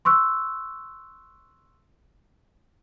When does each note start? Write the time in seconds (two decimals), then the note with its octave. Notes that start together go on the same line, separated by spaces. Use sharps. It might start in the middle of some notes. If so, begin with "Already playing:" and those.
0.05 C6 C#6 E6 F#6